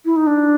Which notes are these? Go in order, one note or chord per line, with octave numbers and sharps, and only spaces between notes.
E4
D#4
D4